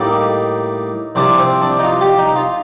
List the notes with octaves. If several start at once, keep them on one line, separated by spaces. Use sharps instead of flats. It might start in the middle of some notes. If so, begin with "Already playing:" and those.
Already playing: A2 G3 A#3 D#4
C2 C3 F3 D4
C4
D4
D#4
F4
G4
D#4
F4